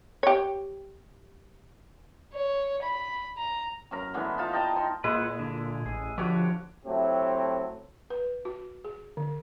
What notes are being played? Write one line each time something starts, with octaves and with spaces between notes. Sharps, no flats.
G4 C#5
C#5
B5
A#5
F#2 A#4 A#5
D3 E3 G#3 B3
D#4 F4 A5
D#5 G5 A5 A#5
D#4 C6
A#2 G#3 E4 B4 C5 F#5
D3
A1 G#4
D3 F3 D4 F#4 G4 C#5 D6
F#3 A3 C4 E4 G4
B4
F#4
G#4
D3